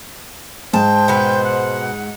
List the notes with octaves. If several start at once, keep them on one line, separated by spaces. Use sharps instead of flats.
G#2 C5 G5 A5
B2 B3
F#5